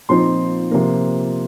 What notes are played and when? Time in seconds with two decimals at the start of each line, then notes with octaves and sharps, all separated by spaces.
0.09 A#2 F3 C4 D#4 C6
0.71 C3 F3 A#3